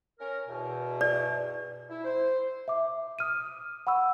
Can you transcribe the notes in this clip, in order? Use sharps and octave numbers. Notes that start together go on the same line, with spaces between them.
C#4 A#4
E2 B2
D5
E4
C5
E5 D6
D#6 F6 D#7
F#5 B5 C#6 E6